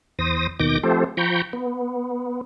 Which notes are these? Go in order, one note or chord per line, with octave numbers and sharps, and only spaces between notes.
E2 C5 D#6 A#6
D#2 B2 D#3 D6 G6 A#6
F3 A3 C4 G4 A4 C5
F3 G5 A#5 B5 C#6 G6
B3